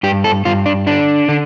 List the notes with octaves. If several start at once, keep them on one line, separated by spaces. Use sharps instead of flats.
G2 G4
A4
G2 F4
D4
D3 D4
D3